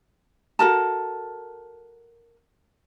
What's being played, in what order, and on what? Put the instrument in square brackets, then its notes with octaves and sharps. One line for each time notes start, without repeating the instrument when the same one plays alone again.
[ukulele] F#4 A4 A#4 A5